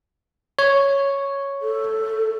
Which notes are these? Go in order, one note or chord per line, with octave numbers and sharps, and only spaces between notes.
C#5
A4